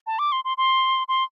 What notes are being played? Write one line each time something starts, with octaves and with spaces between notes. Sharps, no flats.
A5
D6
C6
C6
C6
C6